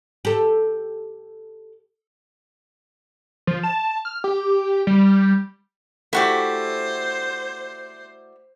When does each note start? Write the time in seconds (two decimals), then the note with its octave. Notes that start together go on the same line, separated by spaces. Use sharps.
0.25 G4 A4
3.47 F3
3.63 A5
4.05 F6
4.24 G4
4.87 G3
6.13 A3 E4 F#4 G4 C5 D5